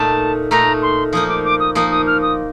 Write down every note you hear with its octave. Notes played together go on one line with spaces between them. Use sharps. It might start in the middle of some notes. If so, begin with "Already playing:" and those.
Already playing: A#2 A3 D#4 A5
A#2 A3 D#4 A#5
C6
F3 A#3 D#4 D#6
D6
D6
D#6
F3 A#3 D#4 D#6
D#6
F6
D#6